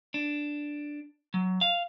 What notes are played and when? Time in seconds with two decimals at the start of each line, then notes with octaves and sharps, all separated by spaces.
0.14 D4
1.34 F#3
1.61 F5